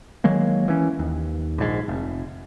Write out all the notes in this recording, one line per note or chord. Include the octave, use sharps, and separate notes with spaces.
D#3 F#3 G#3 A#3
E3 C#4
D#2
A#1 G#2
F1